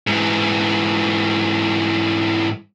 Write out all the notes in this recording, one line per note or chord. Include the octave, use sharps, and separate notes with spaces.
G#2 E3